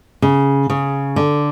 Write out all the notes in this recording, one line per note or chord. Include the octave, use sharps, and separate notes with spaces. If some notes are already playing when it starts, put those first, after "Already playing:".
C#3
C#3
D3